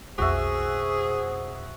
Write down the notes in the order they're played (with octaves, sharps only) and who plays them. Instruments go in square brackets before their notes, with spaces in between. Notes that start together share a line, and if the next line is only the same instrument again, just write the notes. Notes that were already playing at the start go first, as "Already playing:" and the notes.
[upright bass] B1 F2 [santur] F#4 E5 [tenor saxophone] G#4 [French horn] C5